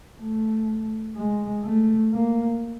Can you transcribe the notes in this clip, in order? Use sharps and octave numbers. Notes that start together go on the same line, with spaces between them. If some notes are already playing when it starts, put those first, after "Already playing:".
A3
G#3
A3
A#3